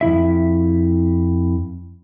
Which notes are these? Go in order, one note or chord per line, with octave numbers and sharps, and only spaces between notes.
F2 D#3 E4 E5